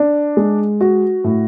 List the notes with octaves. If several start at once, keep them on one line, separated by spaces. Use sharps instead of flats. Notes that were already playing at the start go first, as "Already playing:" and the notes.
Already playing: D4
G#3
F#4
A2